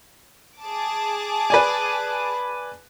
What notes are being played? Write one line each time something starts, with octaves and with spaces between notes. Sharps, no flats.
G#4 A5 D6
B4 D5 G#5